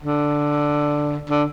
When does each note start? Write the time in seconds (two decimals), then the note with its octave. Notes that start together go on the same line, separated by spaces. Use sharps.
0.01 D3
1.29 D3